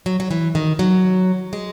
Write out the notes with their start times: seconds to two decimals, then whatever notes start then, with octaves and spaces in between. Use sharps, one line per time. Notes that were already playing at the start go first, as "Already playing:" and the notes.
0.06 F#3
0.20 F#3
0.31 E3
0.55 D#3
0.79 F#3
1.53 G#3